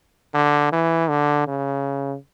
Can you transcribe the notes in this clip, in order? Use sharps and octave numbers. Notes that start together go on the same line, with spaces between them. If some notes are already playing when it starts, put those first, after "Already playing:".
D3
E3
D3
C#3